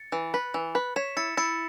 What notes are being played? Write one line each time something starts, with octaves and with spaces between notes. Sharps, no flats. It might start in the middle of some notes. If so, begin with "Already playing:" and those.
Already playing: A6 C#7
E3
B4
E3
B4
C#5 B6 E7
E4 A6 C#7
E4 A6 C#7